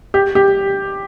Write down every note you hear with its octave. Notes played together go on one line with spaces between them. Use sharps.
G4
G4